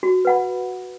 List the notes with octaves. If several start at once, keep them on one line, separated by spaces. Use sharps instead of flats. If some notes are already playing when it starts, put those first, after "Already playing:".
F#4
B4 F#5 B5